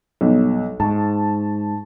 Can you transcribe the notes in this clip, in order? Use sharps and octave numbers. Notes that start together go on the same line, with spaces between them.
B1 G2
G#2 A5 C#6